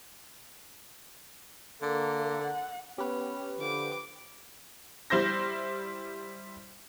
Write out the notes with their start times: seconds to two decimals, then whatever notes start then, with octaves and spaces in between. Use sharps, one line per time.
1.82 D3 A#3
2.42 F#5
2.98 B3 C#4 G4 B4
3.59 D3 F3 D6
5.10 G3 E4 C5 G6 A#6